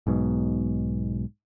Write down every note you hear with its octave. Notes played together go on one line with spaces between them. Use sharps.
B1 G#2 B2